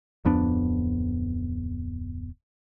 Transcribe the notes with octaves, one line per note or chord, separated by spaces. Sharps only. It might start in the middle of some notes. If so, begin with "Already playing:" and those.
D1 F2 B3 D4